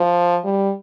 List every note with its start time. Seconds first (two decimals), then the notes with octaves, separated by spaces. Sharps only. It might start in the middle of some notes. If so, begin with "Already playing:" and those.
Already playing: F3
0.44 G3